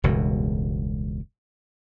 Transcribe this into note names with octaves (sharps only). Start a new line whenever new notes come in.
E1 C#2 G2 B2